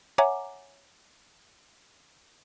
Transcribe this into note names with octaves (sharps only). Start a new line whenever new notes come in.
C#5 E5 F#5 G#5 A#5 D6